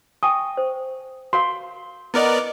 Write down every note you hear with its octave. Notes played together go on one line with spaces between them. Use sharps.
G5 G#5 C#6 D#6
C5
F#4 A#4 F5 C6
B3 E4 A#4 D5 D#5